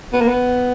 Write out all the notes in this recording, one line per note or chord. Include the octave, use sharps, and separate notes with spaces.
B3
A#3
B3